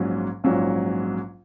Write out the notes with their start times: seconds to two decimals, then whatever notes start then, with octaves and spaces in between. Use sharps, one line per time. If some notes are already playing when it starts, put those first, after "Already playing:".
Already playing: A#1 G#2 F#3 C#4 F4
0.44 A#1 G#2 F#3 C#4 F4